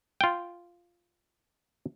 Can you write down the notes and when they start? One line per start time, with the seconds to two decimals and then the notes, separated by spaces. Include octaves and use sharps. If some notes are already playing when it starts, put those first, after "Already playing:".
0.21 F4 G5